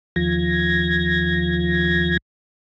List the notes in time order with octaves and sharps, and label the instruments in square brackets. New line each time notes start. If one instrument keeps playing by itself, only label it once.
[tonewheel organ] D#2 F3 G#6 A#6